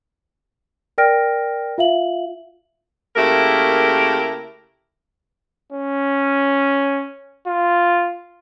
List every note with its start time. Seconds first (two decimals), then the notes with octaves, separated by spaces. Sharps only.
0.98 A#4 D5 G5 F6 A#6 D7
1.78 F4 E5 F5 F#7
3.16 C#3 A3 A#3 E4 G4 A#4
5.72 C#4
7.47 F4